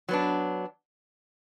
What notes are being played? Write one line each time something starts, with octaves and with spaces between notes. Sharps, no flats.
F#3 B3 D4